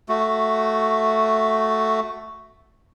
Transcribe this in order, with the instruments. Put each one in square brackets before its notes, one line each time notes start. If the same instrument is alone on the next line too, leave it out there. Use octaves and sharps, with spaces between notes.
[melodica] A3 F#4